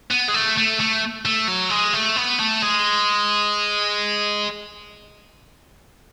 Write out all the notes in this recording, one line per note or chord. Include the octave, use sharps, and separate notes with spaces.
B3
G#3
A3
A3
A3
A3
F#3
G#3
A3
B3
A3
G#3